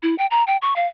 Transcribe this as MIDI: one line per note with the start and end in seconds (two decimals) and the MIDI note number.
0.03 0.15 64
0.18 0.26 79
0.31 0.44 82
0.47 0.57 79
0.62 0.74 85
0.76 0.87 77